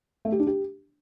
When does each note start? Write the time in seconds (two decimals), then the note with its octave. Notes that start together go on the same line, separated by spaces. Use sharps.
0.25 A3
0.32 G4
0.40 D4
0.47 G4